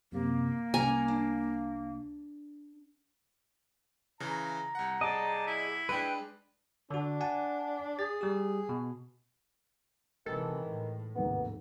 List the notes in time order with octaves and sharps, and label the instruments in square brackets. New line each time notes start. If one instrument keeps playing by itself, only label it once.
[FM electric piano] F#2 C3 [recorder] A#3
[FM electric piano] C2 [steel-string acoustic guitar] C#4 A#5 [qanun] G#5
[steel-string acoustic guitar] D4
[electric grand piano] C#3 E3 [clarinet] A#5
[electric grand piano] C2 F#5
[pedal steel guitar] G#4 D5 D#5 [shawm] A5
[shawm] E4
[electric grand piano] G#3 D4 [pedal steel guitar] B4 G5
[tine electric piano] D3 F#4 [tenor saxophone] D4
[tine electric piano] F#5 G#5 A5
[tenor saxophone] G#4 [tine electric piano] A6
[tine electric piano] G3 G4
B2
[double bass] C3 E3 [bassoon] D#3 [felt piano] G#3 [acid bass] A4
[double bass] A2
[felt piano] F1 D#2 G#2 [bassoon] B3